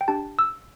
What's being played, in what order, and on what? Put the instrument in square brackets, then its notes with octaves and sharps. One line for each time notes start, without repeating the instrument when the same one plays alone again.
[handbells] G5
D4 G4 A5
E6